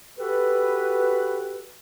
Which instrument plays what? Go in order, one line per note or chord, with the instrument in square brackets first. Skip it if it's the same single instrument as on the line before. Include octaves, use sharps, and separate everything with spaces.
[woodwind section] F#4 G4 A4 B4